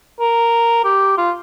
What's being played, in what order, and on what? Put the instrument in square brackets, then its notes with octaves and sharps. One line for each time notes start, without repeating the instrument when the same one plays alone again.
[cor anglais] A#4
G4
F4